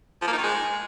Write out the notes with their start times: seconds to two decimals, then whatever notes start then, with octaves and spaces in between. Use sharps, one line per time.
0.22 F3
0.27 A#3
0.32 D#4
0.38 D#3
0.43 G#3